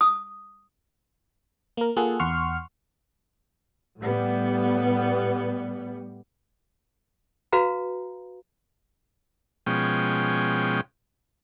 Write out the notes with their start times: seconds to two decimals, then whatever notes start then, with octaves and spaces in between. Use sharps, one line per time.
0.01 D#6
1.77 A#3 A#4
1.97 A#3 F4 G#4 A4 F#5
2.20 E2 F#5 C6 C#6 F6
4.01 A2 G3 B3
7.52 F#4 B4 F5 A#5
9.66 B2 F3 G#3 C#4 G5